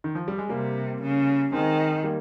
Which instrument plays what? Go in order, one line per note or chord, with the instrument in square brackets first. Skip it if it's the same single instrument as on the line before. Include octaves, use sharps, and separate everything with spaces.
[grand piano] D#3
F3
G3
G#3
[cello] C3 [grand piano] G3 A#3
[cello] C#3
[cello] D#3 [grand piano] G#3 C4
[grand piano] G3 A#3